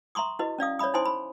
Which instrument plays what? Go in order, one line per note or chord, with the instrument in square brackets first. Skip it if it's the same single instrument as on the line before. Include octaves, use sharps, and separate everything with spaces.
[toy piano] E5 A#5 C6 C#6 D#6
E4 F#4 B4 D#5
C#4 D5 F5 D#6
C#5 D5 E5 B5 D#6
D#4 E4 C5 G#5 C6 D#6
B5